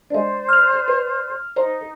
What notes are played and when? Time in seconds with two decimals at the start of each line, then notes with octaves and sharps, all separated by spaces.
0.10 G#3 D4 C5 D5
0.49 F6 F7
0.88 B4
1.56 D#4 C5 A#5